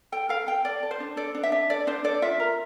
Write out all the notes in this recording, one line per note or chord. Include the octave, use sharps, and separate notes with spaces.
A4 G5
A4 F5
A4 G5
A4 D5
A4
C5
D4
A4 D5
D4
E5
D4
A4 D5
D4 C5
A4 D5
F4 E5
A#4